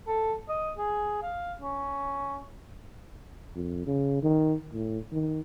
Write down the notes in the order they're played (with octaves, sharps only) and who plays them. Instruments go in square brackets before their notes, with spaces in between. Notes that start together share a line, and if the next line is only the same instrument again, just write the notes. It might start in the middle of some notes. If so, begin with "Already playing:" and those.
[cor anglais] A4
D#5
G#4
F5
C#4
[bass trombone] F2
C#3
D#3
A2
D#3